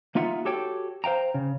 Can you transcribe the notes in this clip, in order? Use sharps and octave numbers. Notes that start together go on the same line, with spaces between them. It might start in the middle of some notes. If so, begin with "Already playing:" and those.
A#3 D#4 F4 E5 F#5
F#4 G4 A4 C#5 G5
C5 F5 G5 A#5
C#3